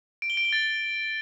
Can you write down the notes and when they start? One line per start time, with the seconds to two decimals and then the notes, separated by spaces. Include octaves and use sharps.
0.22 D7
0.30 G7
0.37 D7
0.45 G7
0.53 A6